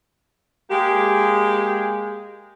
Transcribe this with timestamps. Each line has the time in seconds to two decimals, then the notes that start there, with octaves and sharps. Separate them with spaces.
0.70 G#3 A#3 G4